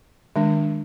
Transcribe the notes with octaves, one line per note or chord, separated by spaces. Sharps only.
D#3 G#3 D4